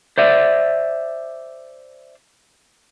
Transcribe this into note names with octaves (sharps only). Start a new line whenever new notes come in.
C5 D5 E5